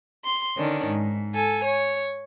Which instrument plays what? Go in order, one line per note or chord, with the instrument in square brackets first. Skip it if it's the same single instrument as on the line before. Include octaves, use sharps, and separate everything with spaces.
[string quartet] C6
D3 D#3 C#4 D4
G#2
A4 G#5
C#5